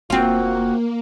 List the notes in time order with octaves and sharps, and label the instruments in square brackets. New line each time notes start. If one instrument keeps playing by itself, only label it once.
[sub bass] F1 [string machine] A#3 [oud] C4 F4 [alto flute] F#4